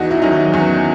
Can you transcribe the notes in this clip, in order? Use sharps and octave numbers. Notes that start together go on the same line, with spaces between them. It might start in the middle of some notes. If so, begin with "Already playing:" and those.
Already playing: E2 D#4 F#4
E4
D#3 F#3 C#4 D#4
E2